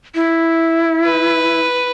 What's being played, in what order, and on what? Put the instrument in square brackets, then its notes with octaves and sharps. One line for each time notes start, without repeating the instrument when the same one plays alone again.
[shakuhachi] E4
[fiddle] B4